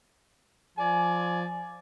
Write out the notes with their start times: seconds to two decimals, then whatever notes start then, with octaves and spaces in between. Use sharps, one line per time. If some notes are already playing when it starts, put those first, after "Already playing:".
0.78 F3 D5 G#5